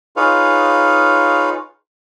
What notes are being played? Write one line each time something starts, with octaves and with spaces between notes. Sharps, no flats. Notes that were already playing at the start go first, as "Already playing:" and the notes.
D#4 F4 G#4 B4 C#5 F5